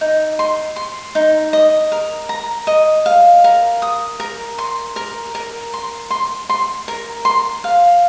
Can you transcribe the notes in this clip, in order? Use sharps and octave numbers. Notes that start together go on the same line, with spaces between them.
D#4
C6
C6
D#4
D#5
A#4
A#5
D#5
F5
A#4
D#6
A#4
C6
A#4
A#4
C6
C6
C6
A#4
C6
F5